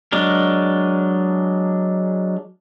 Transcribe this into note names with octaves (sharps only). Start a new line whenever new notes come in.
F#3 G#3 D4 A#4